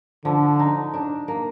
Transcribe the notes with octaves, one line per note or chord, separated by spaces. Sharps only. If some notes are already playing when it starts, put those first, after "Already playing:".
D3 F3
D#4
D4
A#3